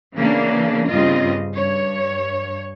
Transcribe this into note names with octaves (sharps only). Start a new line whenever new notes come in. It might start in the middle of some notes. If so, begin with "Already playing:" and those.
C#3 E3 A#3 B3 C#4 D4
G2 C#3 C4 F4 D#5
G2 C#5